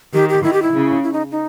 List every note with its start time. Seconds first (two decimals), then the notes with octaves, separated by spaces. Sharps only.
0.14 D#3 G4
0.29 G4
0.43 D#3 E4
0.53 G4
0.62 E4
0.74 C#3
1.03 E4
1.13 D#4
1.31 D#4